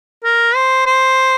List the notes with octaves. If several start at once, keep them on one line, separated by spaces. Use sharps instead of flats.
A#4
C5
C5